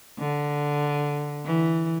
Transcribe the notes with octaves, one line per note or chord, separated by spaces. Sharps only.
D3
E3